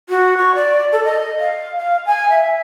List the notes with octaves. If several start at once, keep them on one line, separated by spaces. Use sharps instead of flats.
F#4
C#6
D5
A4
D#5
F5
F5
G#5
E5